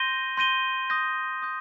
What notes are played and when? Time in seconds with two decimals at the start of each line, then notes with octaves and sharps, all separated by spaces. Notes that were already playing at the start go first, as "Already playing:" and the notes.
Already playing: C6 G6 A#6 D#7 G7
0.37 C6 G6 A#6 D#7 G7
0.90 D#6 G6 A#6
1.42 D#6 G6